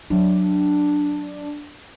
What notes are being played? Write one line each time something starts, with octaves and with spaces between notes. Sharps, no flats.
F#3 D4 D#4